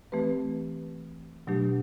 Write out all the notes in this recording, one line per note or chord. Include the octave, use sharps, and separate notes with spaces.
E3 A3 C4 G4 B4
B2 F#3 A3 D4 G4